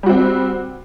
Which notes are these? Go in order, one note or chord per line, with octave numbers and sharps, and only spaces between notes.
G3 C4 F#4